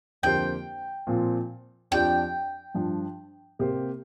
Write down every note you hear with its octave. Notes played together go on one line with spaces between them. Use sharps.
F2 D3 A#3 G4 C5 G5
A#2 F3 C4 F4
F2 F3 D4 G4 D5 G5
G2 F3 D4
C3 A#3 G4 C5